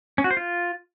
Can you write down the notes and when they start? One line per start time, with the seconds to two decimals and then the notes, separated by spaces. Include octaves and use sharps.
0.18 C#4
0.24 F#4
0.31 C5
0.37 F4